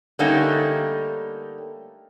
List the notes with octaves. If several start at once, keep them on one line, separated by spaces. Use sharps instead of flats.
D3 G3 A3 A#3 C#4 D#4